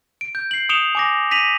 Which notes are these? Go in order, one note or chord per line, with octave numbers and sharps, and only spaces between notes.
D7
G6
C7 F#7
D#6 C#7 D7 E7 F7 G7
G#5 D6 A#6
A#6 B6 D#7 F7 F#7